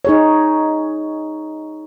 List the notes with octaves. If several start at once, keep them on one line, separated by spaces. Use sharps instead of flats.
D#4 G#4 C#5